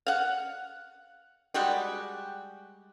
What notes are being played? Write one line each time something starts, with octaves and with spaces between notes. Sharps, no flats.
F5 F#5
G3 G#3 F#4 G4